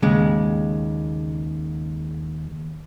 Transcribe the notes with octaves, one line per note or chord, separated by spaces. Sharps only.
D#2 C#3 G#3